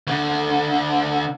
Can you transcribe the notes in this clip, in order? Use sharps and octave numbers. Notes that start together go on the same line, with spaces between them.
D2 D3